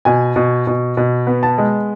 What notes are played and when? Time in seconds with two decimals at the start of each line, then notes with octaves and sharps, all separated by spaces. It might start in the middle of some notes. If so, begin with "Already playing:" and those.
0.05 B2 G#5
0.36 B2
0.67 B2
0.97 B2
1.27 B3
1.43 A5
1.58 G#3